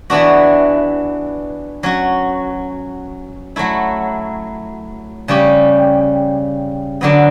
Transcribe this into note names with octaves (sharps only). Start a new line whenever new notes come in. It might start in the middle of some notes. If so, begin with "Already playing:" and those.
E3 B3 D4 F#4
F#3 C#4 F#4
F#3 A3 E4
C#3 G3 C#4 G4
D3 F#3 B3